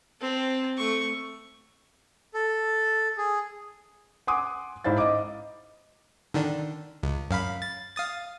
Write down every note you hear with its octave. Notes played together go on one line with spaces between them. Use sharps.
C4 A5
A3 C#6
A4
G#4
F#5 G#5 C6 D6 D#6
G#2 E4 C5 F5 A6
D#5 D6
D3 D#3 D4
C#2
F#2 F5 B5
A6
F5 D#6 A6